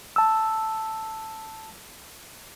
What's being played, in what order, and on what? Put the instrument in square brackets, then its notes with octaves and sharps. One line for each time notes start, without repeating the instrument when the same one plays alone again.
[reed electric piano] A5 E6